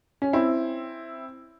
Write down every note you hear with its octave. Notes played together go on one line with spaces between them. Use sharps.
C#4
C4 E4